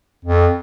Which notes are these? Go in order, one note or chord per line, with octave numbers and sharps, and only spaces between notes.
F2